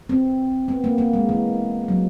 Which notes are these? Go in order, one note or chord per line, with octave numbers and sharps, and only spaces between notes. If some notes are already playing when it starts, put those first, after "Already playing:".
C4
B3
A#3
A#3
G#3
E3
F#3